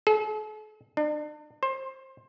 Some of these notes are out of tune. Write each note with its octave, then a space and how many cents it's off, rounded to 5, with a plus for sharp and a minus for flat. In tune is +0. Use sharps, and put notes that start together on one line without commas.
A4 -45
D4 +40
C5 +20